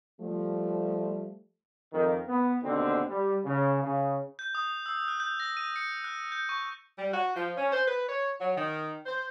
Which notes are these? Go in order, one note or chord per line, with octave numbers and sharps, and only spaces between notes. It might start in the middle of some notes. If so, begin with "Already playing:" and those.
F3 G3 A3
F2 D#3
B3
D#2 B2 D3 A3 C4 D#4
G3
C#3
C#3
G6
D#6
E6
F#6
G6
A#6
D#7
C#7
F#6
G6
C#6
G3
F#4
F3
C#4
C5
B4
C#5
F#3
D#3
C5